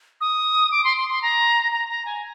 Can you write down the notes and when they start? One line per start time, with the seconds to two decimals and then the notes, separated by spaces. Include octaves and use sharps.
0.21 D#6
0.71 D6
0.84 C6
0.97 C6
1.09 C6
1.22 A#5
1.72 A#5
1.89 A#5
2.05 G#5